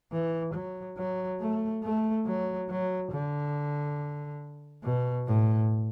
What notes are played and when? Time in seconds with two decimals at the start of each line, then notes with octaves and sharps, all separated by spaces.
0.12 E3
0.54 F#3
0.97 F#3
1.40 A3
1.84 A3
2.26 F#3
2.69 F#3
3.11 D3
4.84 B2
5.27 A2